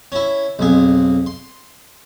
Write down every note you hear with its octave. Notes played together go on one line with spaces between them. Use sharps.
C#4 E4
B1 F2 G#4
C6